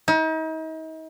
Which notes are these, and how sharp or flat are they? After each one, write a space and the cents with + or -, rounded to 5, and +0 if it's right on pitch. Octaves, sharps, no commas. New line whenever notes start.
D#4 +40